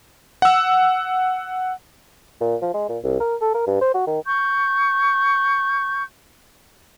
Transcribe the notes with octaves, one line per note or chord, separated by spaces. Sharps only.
F#5 E6
A#2
F3
G#3
A#2
C2
A#4
A4
A#4
G2
C5
F#4
D#3
C#6 G6